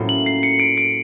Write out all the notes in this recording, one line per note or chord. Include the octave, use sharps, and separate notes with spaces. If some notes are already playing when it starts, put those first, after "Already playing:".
Already playing: A2 F#3 A#3 C#4 F4
F#7
C7
C#7
D7
D7